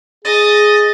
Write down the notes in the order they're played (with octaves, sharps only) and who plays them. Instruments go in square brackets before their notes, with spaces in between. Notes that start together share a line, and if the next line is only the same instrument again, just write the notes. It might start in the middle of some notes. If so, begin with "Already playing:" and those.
[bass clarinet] G#4 [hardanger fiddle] D#5 [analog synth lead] A6